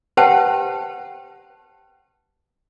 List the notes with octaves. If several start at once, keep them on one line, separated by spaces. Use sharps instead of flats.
G4 B4 C5 F#5 G5 A5